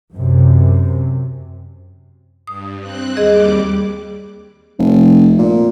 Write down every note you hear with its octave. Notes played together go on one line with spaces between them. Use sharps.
F#2 C3
G2 D#6
C4 F#6
D#2 G3 G#4 D#5 D6
F1
A#2